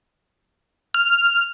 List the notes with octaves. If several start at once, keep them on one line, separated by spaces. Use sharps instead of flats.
F6